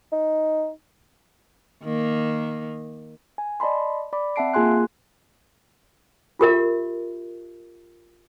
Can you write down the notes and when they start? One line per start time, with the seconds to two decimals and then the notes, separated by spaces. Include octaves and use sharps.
0.12 D#4
1.83 D#3 A#3
3.38 G#5
3.60 D5 D#5 A5 B5 C6
4.13 D5 B5 D6
4.36 C4 E5 F#5 A5 C7 D7
4.54 A#3 F4 G#4 G#5 C6 F#6
6.39 F4 G4 A#4 E5